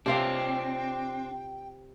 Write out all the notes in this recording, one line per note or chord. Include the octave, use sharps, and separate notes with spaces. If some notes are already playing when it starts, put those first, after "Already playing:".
C3 C4 D4 F4 F5 G5